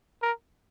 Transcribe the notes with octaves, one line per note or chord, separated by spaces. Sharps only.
A#4